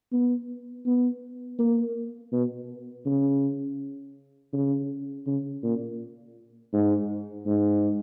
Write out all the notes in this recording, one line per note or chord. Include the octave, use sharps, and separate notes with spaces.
B3
B3
A#3
B2
C#3
C#3
C#3
A#2
G#2
G#2